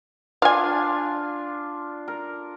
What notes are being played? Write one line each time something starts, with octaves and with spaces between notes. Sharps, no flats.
D4 F4 F5 G#5
A#4